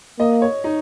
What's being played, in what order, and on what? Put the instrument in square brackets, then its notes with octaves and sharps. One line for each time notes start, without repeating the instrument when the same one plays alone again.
[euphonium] A#3 [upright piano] D#5
[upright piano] C#5
D#4